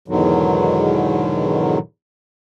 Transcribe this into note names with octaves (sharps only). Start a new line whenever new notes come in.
E2 G#2 B2 D3 D#3 F#3